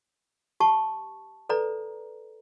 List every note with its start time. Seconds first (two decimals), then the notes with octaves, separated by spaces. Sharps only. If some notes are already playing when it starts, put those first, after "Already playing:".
0.60 G4 A5 C#6
1.49 A4 B4 D5 A#5